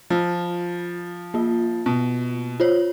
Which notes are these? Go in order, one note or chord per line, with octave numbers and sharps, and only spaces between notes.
F3 F4
A#3 F4
B2
F4 C5 C#5